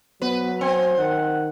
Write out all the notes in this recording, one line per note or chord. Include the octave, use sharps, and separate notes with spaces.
F#3 B3 B4
C4 G#5
D#3 F#5